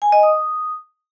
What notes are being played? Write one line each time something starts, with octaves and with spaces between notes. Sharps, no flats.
G#5
D#5
D#6